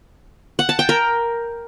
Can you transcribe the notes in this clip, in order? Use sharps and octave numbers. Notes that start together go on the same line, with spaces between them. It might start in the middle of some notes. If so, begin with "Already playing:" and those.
F#5
A5
G5
A#4